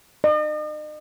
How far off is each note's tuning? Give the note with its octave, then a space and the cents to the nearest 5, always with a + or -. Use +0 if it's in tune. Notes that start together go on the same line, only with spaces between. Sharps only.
D#5 -40